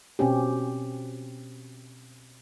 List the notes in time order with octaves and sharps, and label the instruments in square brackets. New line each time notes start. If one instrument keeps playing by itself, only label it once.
[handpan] B2 C4 C#4 G4